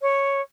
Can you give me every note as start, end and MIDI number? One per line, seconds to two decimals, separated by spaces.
0.01 0.41 73